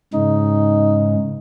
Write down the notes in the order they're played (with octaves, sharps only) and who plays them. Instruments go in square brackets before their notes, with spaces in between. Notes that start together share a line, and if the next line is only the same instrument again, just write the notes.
[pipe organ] G#2 C#3 [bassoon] D#4